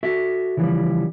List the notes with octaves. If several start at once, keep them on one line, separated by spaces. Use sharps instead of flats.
F#4 A4 E5
C#3 E3 F3 G3